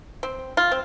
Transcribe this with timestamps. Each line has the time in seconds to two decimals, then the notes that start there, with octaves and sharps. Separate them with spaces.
0.23 C4
0.57 F4
0.71 C4